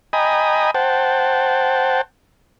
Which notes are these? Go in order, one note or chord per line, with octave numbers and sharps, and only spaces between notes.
D#5 G5 G#5 A#5 B5 D#6
C5 F#5 G5 A5